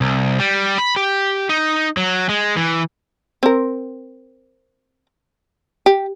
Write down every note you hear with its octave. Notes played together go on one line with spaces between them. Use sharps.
C2
G3
B5
G4
D#4
F#3
G#3
E3
C4 A#4
G4